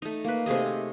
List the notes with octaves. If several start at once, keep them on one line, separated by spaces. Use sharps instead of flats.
A3 D#4
A#3 B4
C3 A3 G#4 D#5